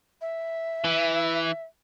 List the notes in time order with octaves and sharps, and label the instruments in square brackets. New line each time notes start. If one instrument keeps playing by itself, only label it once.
[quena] E5
[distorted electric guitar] E3